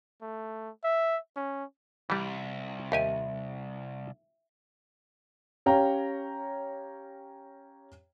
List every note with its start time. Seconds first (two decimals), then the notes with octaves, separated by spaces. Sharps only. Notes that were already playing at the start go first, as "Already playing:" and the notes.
0.22 A3
0.84 E5
1.36 C#4
2.10 C2 E3 G3
2.92 D#2 G4 E5 G#5 D#7
5.66 C#4 G4 C#5 F5 G5 A#5